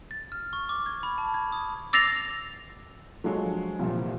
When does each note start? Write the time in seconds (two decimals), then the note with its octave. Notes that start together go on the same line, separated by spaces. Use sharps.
0.11 A6
0.32 F6
0.53 C#6
0.69 D6
0.86 G#6
1.03 B5
1.18 A5
1.34 G#6
1.52 D#6
1.93 D6 E6 A6 A#6 C7 F7
3.24 F#3 G#3 D4 F4 A4 C#5
3.46 F3
3.79 C2 A#2 F3 G3 F4
3.94 E3 E4